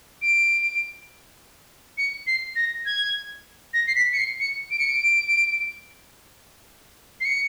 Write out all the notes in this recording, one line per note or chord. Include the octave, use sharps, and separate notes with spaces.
D7
C#7
C7
A#6
G#6
A#6
C7
B6
C#7
C7
C#7
D7
C#7
D7
C7
C#7